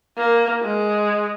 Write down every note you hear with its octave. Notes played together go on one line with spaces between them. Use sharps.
A#3
G#3